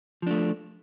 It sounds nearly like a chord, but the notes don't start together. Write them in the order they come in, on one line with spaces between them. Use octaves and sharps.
F3 D4 A3